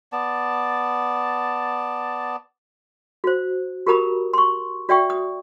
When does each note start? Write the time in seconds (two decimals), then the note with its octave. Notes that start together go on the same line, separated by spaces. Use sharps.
0.12 B3 D5 A5
3.24 F#4 C5
3.87 F#4 G4 A#4 A#5 B5 D#6
4.34 C6 C#6
4.89 F#4 D5 E5 G5 C#6
5.10 D#6